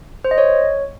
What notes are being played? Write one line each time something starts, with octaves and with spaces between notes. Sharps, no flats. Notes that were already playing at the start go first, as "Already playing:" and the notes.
C5
D#5
C#5